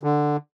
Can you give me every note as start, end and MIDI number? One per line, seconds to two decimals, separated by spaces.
0.03 0.37 50